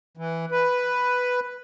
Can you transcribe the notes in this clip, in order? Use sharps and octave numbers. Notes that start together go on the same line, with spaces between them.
E3
B4